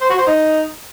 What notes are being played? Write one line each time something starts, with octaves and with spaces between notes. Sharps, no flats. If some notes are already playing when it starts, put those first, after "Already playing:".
C5
F#4
C5
D#4